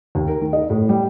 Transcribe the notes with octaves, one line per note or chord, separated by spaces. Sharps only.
D#2
A#4
D#3
D#5
A2
G3